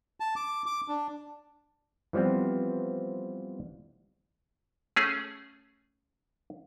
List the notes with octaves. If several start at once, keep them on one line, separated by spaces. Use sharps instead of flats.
A5
D6
D6
D4
E3 F3 G3 B3 C4
A3 C#4 G#4